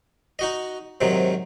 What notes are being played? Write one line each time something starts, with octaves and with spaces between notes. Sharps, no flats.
D#4 F#4 D#5
G#2 C3 D#3 F#3